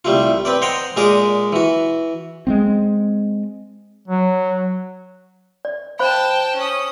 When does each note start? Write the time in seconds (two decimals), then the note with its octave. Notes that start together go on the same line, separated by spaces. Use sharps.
0.05 C2 G3 A3 F4
0.45 C4 B4 D5
0.62 C5 D#5 F#5 G5 A#5 C6
0.97 A#2 G#3 G#4 A#4 D5 D#6
1.52 E3 F#4
2.47 G#3 B3 C4
4.08 F#3
5.65 D5
5.99 C5 F5 G5 A5 B5
6.56 C#4 D#6